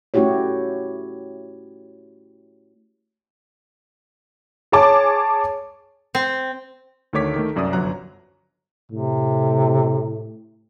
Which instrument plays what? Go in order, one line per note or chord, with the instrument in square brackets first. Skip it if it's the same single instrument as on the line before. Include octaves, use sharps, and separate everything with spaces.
[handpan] A3 C#4 E4 F#4 G4 C#5
[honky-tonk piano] G#4 C#5 G#5 A5 D6
[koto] C4
[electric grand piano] D2 D#3 A3 C#5 D6 B6
D#3 A3
C2 F#2 D5 E5 D#6
G1 F3 F#3 A#5 F#6
[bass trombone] A2 [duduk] C3